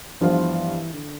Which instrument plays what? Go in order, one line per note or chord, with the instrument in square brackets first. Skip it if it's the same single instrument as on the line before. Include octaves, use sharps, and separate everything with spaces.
[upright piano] G2 F3 B3 F4 [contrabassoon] E3
[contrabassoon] D3